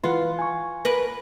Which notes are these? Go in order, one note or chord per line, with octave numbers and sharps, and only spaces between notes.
E3 F4 B4 F#5
G#5 C#6
A#4 B4